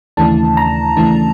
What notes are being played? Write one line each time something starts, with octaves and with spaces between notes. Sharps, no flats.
D#2 C#3 E3 A3 D4 A5
A#5
D#2 C#3 E3 A3 D4 A5